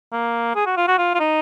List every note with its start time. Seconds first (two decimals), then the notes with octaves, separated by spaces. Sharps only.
0.12 A#3
0.55 G#4
0.66 F#4
0.77 F4
0.88 F#4
0.98 F4
1.15 F4
1.20 D#4